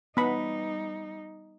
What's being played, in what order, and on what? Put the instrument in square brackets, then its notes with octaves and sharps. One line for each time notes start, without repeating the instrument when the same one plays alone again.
[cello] G3 D#4 [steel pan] B3 B5